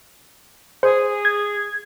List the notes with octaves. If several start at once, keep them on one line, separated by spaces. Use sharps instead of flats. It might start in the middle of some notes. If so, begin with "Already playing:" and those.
G#4 C5
G#6